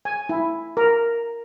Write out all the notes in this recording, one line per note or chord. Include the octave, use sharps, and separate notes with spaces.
G#5
E4
A#4